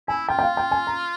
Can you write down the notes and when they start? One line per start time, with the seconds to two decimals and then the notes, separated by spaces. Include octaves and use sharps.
0.08 E4 G#5
0.28 F4 G5
0.39 G5
0.43 F5
0.57 G5
0.71 G#5
0.87 A#5